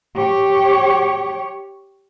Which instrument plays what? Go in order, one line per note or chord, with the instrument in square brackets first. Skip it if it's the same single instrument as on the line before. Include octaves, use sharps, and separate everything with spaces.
[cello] G4 C#5